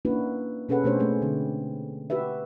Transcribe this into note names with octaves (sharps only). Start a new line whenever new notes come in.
A#3 C#4 D4 E4 F#4 B4
B2 C#4 G#4 A4 B4 F#5
B2 A3 D4 G4 C5 C#5
G#3 A3 C4 G#4
D3 C4
F#4 G4 B4 E5